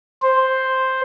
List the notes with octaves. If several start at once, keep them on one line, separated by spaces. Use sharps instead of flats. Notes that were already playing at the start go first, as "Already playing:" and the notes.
C5